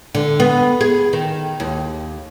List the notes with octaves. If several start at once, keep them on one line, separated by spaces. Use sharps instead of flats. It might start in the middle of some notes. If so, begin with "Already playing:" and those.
D3
B3
G#4
D#3
D#2